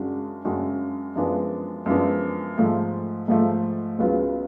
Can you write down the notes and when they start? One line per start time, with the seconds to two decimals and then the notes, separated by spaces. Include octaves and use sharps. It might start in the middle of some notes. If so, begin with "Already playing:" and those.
Already playing: F#2 C#3 G#3 D4 F#4
0.45 F#2 C#3 G#3 D4 F#4
1.16 F#2 F3 G#3 B3 D4
1.86 F#2 F3 G#3 B3 D4
2.57 G#2 F3 A3
3.28 G#2 F3 A3
3.99 C#2 C#3 F#3 B3 F4